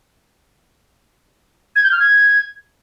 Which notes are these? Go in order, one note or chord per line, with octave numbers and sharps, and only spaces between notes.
G#6
G6
F6
G#6